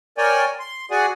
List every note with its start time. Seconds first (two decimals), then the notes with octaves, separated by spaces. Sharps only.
0.18 A#4 C#5 D5 G5 G#5
0.60 C6
0.91 F#4 G#4 D5 F#5 G#5